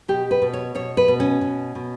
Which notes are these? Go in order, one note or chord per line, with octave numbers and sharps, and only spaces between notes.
B2 G4
B4
B2
C#5
B2 C#5
B4
B2
C#4
B2
B2